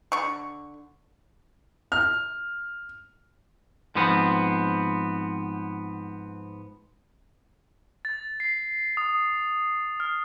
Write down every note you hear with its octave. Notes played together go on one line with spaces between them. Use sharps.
D3 C#6
F6
G#2 F3 B3 C4
A6
C7
D#6
F6